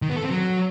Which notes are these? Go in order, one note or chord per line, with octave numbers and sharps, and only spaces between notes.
D#3
B3
A4
C4
F#3